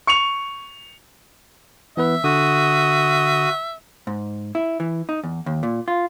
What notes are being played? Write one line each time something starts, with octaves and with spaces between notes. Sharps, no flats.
C#6 C#7 F7
E3 B3 B4 E5
D3 F#4 D#6
G#2
E4
E3
D#4
E2
D#2
A#2
F4